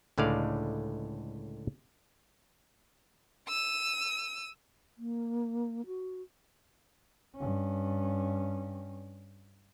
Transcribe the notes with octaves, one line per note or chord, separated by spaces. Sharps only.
C#2 A2 D3 G#3 D5 F5
E6 D#7
A#3
F#4
G2 C#4